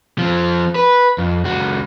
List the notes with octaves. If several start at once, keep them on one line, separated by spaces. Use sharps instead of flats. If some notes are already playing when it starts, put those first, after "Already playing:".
F3 C4
B4
F2
C#2 F#4